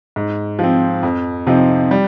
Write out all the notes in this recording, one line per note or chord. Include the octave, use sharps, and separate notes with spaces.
G#2
F3 C4
F2
C3 F3 C4 D#4
G3